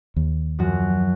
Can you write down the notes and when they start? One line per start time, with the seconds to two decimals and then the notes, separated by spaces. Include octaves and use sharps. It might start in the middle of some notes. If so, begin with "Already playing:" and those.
0.16 D#2
0.59 F#2 F3 F#4